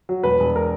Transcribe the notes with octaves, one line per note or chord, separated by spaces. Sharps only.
F#3
E1 B4
E1
A#4